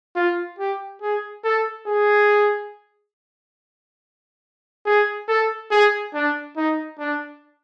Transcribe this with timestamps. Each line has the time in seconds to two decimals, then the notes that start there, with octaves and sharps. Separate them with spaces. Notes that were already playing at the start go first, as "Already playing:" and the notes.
0.16 F4
0.59 G4
1.02 G#4
1.44 A4
1.87 G#4
4.86 G#4
5.28 A4
5.71 G#4
6.14 D4
6.56 D#4
6.99 D4